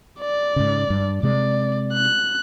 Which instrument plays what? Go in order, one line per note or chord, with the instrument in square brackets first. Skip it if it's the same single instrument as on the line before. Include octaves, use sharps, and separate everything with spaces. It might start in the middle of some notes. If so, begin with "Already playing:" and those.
[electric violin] D5
[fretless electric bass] G#2 C#3
G2
[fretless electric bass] C3 G#3 [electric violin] D5
[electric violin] F#6